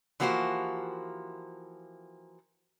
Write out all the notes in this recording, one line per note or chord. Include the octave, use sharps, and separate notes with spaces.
E3 F3 A#3 F#4 G4 C5